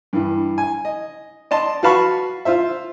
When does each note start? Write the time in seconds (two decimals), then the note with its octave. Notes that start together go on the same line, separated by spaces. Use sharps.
0.13 G2 E3
0.58 G#5
0.85 D#5
1.51 D5 D#5 A5 C6
1.83 F#4 B4 F5 A5 B5 C#6
2.45 F4 C5 E5